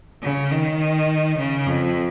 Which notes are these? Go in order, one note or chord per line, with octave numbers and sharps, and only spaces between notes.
C#3
D#3
C#3
F2